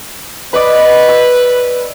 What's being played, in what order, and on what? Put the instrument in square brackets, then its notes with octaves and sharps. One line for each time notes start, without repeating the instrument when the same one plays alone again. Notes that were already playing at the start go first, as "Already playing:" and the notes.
[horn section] B4 [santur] D5 D#5 B5
[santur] E6